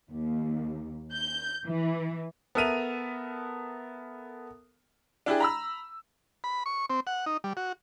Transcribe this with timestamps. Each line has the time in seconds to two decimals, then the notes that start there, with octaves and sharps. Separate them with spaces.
0.11 D#2
1.13 G6
1.66 E3
2.55 B3 A4 A#4 E5 D#7 F7
5.26 D4 E4 G4 G#4
5.40 A#5 B5 E6
6.44 B5
6.66 C#6
6.90 C4
7.07 F#5
7.26 D#4
7.44 G3
7.57 F#4